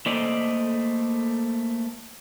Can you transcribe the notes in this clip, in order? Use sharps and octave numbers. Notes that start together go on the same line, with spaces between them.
A3 A#3 A4 C5 D5 D#5